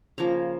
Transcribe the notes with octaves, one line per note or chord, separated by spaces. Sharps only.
C#3 F3 A#3 A#5